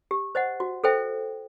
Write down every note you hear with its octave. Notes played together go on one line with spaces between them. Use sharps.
G4
C5 D#5 F#5
F#4
A4 C5 E5 G5